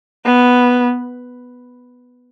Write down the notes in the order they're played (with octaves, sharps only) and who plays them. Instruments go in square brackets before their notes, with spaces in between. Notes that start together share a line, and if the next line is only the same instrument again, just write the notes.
[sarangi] B3